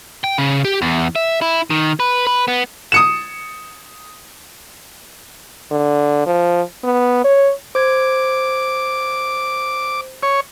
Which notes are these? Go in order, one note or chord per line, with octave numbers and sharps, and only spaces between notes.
G5
C#3
G4
E2
E5
E4
D#3
B4
B4
B3
D#6 C#7 E7
D3
F3
B3
C#5
C5 D6 G#6
C#5